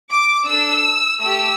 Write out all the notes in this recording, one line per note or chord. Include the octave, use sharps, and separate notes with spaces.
D6
D4 A4 E6
A3 G4 E6